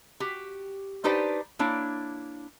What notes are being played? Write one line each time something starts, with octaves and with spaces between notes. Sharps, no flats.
F#4 G4
D4 D#4 G4 B4 C5 D5
A#3 D4 E4 C#5